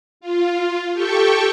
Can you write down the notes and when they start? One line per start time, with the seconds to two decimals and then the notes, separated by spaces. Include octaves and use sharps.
0.21 F4
0.93 G4 A4 G5 C#6